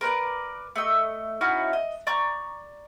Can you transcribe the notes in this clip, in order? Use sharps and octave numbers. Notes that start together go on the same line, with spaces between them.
A#4 B4 C#5 D5
A3 D#5 E6
C#4 D#4 E4 F#4
D#5
D5 A#5 C#6 G6